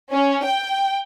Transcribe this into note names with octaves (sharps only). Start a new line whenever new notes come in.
C#4
G5